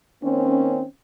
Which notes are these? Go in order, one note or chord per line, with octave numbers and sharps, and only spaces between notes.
D#3 A#3 C4 C#4